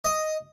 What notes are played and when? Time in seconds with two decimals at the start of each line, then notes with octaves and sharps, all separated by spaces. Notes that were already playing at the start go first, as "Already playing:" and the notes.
0.05 D#5